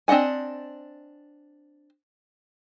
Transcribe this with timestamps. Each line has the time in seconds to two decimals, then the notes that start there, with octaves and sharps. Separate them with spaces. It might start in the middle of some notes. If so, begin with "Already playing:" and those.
0.08 C4 D4 D#5 F#5 G#5